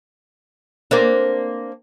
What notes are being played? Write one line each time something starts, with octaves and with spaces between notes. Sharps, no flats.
A#3 C4 D4